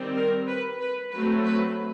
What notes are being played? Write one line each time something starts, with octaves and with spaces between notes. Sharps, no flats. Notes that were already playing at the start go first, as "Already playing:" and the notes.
Already playing: D#3 G3 C4
A#4
B4
B4
F#3 A3 C4 B4
B4